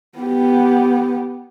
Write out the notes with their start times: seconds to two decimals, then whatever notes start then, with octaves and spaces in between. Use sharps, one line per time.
0.18 B3 G4